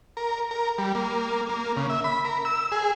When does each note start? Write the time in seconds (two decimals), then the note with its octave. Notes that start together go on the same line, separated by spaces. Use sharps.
0.17 A#4
0.51 A#4
0.78 G3
0.95 A#3
1.49 A#3
1.77 C#3
1.90 E5
2.04 B5
2.24 A#4
2.45 E6
2.72 G#4